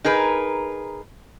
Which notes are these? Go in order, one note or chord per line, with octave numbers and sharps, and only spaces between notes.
D#4 G#4 A#4 B4